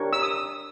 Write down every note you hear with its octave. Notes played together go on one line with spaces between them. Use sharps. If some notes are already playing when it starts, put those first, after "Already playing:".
Already playing: D4 G4 A#4 C#5
E6
D#6